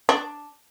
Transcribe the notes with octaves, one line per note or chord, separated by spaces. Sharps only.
D4